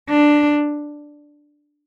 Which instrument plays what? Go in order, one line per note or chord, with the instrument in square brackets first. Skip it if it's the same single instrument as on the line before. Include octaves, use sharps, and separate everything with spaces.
[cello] D4